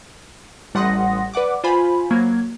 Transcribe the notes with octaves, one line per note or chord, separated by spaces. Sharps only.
A1 G3 F#5 C6 D#6 A#6
B4 D5 F#5 D6
F4 C5 G#5 B5
F#3 A#3 G#6